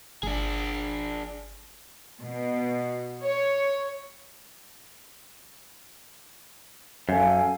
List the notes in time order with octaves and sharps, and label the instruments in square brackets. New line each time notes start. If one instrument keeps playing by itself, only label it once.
[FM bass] G1 [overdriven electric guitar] D4 G#4
[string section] B2
C#5
[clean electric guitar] F#2 [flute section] A4 F5 G#5